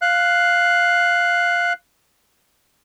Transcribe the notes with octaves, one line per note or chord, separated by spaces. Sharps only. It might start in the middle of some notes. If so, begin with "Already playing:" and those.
F5 F#6